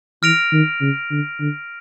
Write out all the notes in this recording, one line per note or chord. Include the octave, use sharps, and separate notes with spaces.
E3 F6 A#6 D7 F7
D#3
C#3
D3
D3